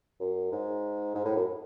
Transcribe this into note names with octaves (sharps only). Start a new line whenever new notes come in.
F#2
G#2
G#2
A2
F#2